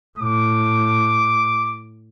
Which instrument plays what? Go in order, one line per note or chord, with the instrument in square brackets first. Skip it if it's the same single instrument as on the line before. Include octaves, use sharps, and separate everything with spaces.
[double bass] A2 [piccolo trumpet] D6